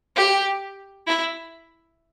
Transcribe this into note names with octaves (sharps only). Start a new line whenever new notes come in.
G4
E4